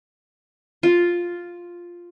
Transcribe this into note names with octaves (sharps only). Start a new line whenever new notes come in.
F4